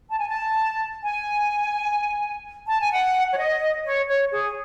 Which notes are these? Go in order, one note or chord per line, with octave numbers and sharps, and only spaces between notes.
A5
G#5
A5
G#5
A5
G#5
F#5
C#5
D#5
C#5
C#5
G#4